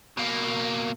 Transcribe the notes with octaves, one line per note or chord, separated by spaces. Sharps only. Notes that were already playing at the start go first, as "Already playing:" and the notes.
B2 A#3